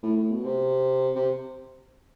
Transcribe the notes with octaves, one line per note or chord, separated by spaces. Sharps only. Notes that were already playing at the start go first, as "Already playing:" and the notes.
A2
A2
B2
C3
C3